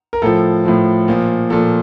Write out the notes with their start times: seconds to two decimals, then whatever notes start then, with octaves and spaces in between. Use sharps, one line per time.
0.13 A#4
0.22 A2 F3 A4
0.65 A2 F3
1.08 A#2 F3
1.50 A#2 F3 A4